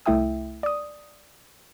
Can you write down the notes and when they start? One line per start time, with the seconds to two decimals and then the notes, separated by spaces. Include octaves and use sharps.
0.06 C2 A3 E4 E5 G5 D#6
0.63 D5 D#6